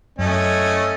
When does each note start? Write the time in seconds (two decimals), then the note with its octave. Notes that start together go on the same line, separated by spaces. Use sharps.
0.19 F#2 A3 C#4 D#5